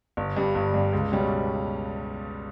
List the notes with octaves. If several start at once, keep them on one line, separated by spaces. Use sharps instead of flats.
G1
G2 G3
G1
G2 G3
C#2
B2 G3 C#4